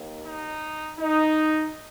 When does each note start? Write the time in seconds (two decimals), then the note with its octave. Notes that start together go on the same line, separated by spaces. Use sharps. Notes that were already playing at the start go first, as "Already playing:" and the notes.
Already playing: D#2 D#3 A#3
0.25 D#4
0.99 D#4